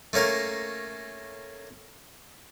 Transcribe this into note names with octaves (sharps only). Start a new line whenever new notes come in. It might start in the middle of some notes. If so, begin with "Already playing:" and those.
A3 A#3 C#4 A#4